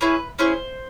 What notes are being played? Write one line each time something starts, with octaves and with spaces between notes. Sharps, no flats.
C#4 E4 G#4 B4
C#4 E4 G#4 C5